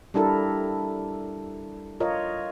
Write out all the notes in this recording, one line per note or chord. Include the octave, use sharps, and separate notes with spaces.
G3 D4 E4 A4 A#4
F4 A#4 C#5 D#5